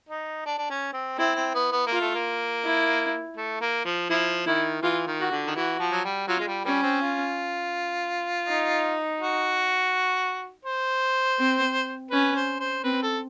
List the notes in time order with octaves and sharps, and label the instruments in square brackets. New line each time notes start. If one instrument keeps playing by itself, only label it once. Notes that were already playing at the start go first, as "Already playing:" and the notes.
[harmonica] D#4
D4
D4
C#4
C4
[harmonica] C4 [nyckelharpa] E4
[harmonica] C4
B3
B3
[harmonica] A#3 [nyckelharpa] F4
[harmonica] A3
A#3
[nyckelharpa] E4
[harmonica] A3
A#3
F3
[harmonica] F3 [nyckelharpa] E4
[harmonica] D#3 [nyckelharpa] E4
[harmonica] E3 [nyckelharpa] F4
[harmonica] D#3
[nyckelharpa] F#4
[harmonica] D3
D#3
[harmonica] E3 [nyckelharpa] F#4
[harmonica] F3
F#3
G3
[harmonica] F#3 [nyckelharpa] F4
[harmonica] G#3
G3
[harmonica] G3 [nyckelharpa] C#4
[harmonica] C4
F4
[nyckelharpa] D#4
[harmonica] F#4
C5
[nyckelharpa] C4
[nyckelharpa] C#4 [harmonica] B4
[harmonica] C5
C5
[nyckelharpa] C4 [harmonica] B4
[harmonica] A4